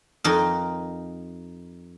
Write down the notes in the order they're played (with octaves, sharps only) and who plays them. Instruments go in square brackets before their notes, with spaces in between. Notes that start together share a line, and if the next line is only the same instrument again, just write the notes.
[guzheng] F2 D#4 A#4